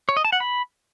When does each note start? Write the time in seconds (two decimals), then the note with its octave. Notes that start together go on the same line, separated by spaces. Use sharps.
0.09 C#5
0.17 D#5
0.25 A5
0.32 F#5
0.40 B5